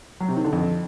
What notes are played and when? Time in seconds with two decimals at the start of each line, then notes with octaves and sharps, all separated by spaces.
0.20 F#3
0.28 C3
0.36 D#3
0.45 D3
0.53 F2